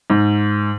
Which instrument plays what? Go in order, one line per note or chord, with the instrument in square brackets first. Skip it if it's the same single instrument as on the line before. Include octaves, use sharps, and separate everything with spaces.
[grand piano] G#2